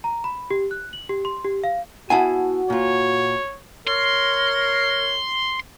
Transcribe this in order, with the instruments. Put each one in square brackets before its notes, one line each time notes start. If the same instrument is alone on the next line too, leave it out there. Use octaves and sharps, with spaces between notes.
[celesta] A#5
B5
G4
F#6
F#7
G4
C6
G4
F5
[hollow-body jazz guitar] B3 E4 G#5 [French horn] F#4 [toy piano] F#5 A5
[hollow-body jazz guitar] A#2 F4 [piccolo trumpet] C#5
[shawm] A#4 [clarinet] C#5 [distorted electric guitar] C6